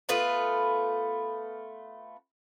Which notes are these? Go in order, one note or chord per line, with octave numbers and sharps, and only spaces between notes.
A3 B3 F4 B4